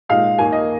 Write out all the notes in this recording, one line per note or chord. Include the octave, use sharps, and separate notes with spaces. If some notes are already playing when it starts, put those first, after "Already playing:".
A#2 G#3 D#4 F5
D#2 D#3 A#3 D#4 G#5
D#5